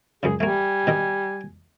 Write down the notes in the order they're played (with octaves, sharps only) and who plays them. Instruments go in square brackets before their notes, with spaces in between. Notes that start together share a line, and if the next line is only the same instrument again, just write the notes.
[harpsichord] C#2 F#2 C#3 [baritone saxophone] G#4
[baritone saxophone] G3 [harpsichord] A3 A#3 [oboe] G#5
[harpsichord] B2 D#3 D#6